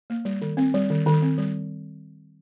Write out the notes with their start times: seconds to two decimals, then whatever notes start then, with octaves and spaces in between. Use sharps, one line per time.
0.10 A#3
0.25 G3
0.42 D#3
0.57 C4
0.74 G3
0.90 D#3
1.06 D#3
1.22 C4
1.38 G3